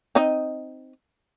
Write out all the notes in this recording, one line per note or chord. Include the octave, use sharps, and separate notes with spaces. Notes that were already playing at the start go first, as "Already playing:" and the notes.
C4 D#4 D#5